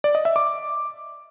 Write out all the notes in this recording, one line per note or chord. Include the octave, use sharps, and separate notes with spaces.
D5
D#5
E5
D6